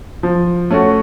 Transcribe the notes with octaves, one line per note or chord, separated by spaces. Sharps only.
F3
A3 C#4 F#4